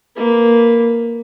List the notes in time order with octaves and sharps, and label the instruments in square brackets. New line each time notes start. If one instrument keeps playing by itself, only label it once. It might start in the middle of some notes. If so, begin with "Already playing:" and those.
[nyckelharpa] A#3 B4